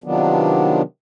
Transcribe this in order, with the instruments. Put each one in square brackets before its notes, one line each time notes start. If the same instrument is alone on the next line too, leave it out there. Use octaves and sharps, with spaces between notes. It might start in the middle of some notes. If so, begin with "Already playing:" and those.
[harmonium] C3 D#3 F3 F#3 B3 D4